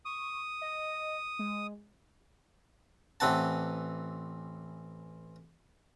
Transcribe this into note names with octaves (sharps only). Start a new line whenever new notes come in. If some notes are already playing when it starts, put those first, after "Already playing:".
C#6 D#6
D#5
G#3
A1 E3 C4 F#5 A5